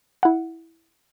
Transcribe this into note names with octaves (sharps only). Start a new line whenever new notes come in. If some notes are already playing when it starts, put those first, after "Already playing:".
E4 F#5